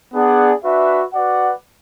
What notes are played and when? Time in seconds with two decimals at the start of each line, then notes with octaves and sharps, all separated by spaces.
0.13 B3 D4 G#4 D5 F#5
0.64 D4 F#4 B4 E5
1.13 F#4 B4 D5 F#5